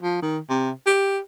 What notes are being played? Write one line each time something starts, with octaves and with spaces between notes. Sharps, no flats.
F3
D#3
C3
G4